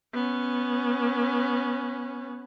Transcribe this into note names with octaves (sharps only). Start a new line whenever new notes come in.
B3 C#4